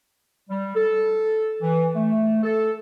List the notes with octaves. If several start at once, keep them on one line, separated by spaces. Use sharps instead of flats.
G3
A4
E3
A3
A4